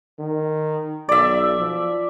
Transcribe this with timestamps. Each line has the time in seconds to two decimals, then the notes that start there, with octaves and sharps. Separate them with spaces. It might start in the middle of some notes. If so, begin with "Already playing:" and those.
0.19 D#3
1.09 B1 D5 E5
1.59 F3